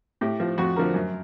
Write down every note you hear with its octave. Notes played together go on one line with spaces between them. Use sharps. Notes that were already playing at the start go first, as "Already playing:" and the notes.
A2 G4
F3
F2 F#4
D3 F3 A#4
F#2